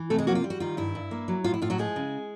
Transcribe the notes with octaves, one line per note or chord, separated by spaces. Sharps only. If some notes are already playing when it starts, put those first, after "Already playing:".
Already playing: E3
C3 A3 A4
G#3 G#4
F#3 A#3 F#4
F4
G3
F#4
D#3 F4
G2 E4
G2
A#3
F#3
A2 F4
E4
A2 F4
F#3 F#4
F3 G#3 G#4
C#3